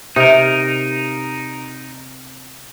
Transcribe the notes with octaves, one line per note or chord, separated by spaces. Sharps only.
C3 D#4 A#4